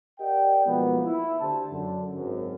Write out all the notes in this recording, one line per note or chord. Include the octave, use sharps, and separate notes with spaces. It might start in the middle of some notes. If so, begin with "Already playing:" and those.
G4 A#4 D5 D#5 F#5 G5
B1 B2 F3 G#3 A#3 B3
E4
D2 G4 C5 A5
F#2 D3
G#1 F#2